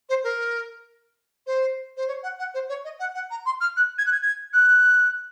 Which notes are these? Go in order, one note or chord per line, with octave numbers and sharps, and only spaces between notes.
C5
A#4
C5
C5
C#5
F#5
F#5
C5
C#5
D#5
F#5
F#5
A#5
C6
F6
F#6
G#6
F#6
G#6
G#6
F#6